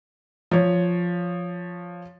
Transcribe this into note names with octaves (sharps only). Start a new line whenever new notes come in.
F3 C#5